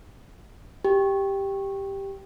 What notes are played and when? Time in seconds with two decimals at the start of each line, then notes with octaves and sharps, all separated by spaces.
0.85 G4